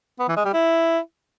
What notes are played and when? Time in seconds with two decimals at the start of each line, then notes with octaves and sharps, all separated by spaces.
0.20 B3
0.28 E3
0.37 G#3
0.45 G3
0.54 E4